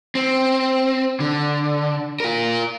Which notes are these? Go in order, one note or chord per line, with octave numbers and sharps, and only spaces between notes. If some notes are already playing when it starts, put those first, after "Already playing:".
C4
D3
F4 A#4